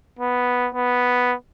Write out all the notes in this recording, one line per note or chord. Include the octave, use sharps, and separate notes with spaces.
B3
B3